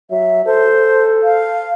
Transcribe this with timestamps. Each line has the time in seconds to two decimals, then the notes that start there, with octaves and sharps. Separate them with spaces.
0.11 F#3 E5
0.46 A4 C5
1.23 F5